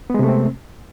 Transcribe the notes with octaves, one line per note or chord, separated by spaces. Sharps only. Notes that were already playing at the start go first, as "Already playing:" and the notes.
C3 G#3 A3 B3 C4